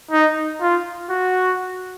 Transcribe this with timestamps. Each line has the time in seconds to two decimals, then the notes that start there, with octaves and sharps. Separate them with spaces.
0.11 D#4
0.61 F4
1.10 F#4